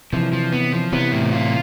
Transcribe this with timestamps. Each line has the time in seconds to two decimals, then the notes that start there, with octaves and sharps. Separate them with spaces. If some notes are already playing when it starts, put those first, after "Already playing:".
0.13 C3 E3 F3
0.33 F3
0.53 B3
0.73 F3
0.92 C3 E3 B3
1.12 A2
1.32 F4